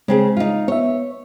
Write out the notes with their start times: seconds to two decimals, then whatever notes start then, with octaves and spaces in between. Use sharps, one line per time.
0.08 C#3 G#3 C4 G#4
0.37 D#4 F4
0.68 B3 C#5 E5